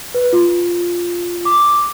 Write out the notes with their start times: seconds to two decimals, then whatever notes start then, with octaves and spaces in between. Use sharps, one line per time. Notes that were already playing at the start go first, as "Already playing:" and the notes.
0.14 B4
0.33 F4
1.45 D6